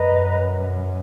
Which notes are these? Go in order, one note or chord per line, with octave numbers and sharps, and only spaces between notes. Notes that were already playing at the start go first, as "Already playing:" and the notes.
Already playing: F#2 B4 D#5 A#5